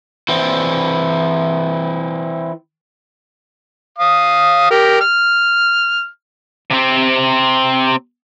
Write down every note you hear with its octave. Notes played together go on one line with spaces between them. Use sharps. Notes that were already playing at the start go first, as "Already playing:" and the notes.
E3 C4
F5 D#6
G4 A#4
F6
C3 C4